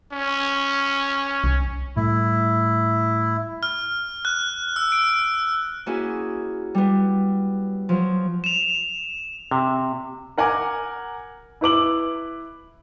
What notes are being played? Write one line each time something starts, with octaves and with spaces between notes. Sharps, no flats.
C#4
C2
A2 G3 A3 E4
F6
F#6
E6
D7
A#3 C#4 E4 F#4 G#4
G3 B3
F3 F#3
E7 F7
C3
A#4 F#5 G#5 A#5 D6
E4 B4 D6 F#7